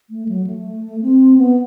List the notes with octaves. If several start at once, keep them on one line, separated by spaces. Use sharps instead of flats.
A3
F#3
A3
C4
B3